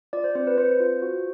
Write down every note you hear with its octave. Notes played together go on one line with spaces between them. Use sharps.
F4 D5
C5
C4 C5
B4
C4 C5
F4
F#4